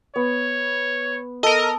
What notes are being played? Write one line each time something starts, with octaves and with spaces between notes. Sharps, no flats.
B3 C#5
A4 A#4 D#5